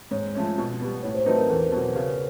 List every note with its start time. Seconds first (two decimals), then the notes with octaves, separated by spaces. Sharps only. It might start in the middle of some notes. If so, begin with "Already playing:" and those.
0.11 G#2 C#5
0.35 F3 A3 C#4
0.58 B2
0.81 G3 B3
1.03 A2 C#5
1.15 C5
1.26 F#3 A3 C4 D#4 B4
1.37 A#4
1.49 E2 A4
1.72 B2 F#3
1.95 C#3